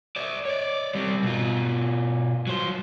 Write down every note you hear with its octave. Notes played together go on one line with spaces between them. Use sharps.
C5 D5
C#5 D5
G3 C4
B2 F4
F#3 C5